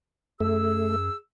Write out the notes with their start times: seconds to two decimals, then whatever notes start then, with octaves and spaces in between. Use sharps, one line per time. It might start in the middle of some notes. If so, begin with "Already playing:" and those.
0.41 F#2 A3 G#4 E6